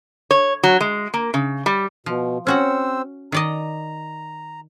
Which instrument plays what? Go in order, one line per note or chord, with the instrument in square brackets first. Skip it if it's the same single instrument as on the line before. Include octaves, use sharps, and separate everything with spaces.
[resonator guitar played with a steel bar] C#5
F#3
G#3
A#3
C#3
G3
[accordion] B2 [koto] F3
[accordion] C4 C5 E6 [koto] C#4 F#4 F#5
[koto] D#3 D5 D#5 [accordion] A#5